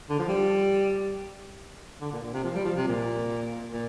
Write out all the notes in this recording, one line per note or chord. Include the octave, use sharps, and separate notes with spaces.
D3
F3
G3
D3
A#2
A#2
C3
F3
G3
F3
C3
A#2
A#2